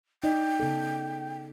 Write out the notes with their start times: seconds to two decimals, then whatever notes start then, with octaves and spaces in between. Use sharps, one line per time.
0.24 D#4 D5 D#5 G5
0.60 C#3 B3 A4